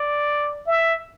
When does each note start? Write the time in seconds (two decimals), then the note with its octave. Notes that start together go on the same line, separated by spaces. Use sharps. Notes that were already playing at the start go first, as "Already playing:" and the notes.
Already playing: D5
0.67 E5